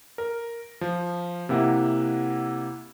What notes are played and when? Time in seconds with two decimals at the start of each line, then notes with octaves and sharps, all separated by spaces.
0.18 A#4
0.81 F3
1.49 C3 A#3 E4 F#5